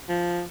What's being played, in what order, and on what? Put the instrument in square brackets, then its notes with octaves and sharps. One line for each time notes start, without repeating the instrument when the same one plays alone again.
[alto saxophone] F3